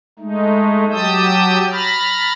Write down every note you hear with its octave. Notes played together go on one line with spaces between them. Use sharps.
G#3 A3 D#4
F#3 G4 A5 D#6 E6 G6
A#5 B5 F6 A6